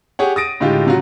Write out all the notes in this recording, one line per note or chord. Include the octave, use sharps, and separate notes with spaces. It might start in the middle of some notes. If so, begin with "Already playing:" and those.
G4 G#4 C#5 F#5
D#6 A6 A#6 D7 D#7
A2 D3 G#3 F4 G4
C#3 F#3 F4 F#4